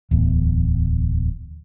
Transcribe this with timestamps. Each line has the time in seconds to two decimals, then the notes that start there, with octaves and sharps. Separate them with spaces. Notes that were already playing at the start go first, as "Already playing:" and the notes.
0.11 D1 E2